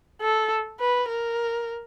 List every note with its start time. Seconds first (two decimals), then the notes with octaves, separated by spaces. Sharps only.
0.21 A4
0.80 B4
1.09 A#4